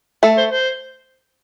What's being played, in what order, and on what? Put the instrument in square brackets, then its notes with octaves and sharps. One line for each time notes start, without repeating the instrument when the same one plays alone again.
[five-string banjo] A3 [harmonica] A4
[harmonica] C5
C5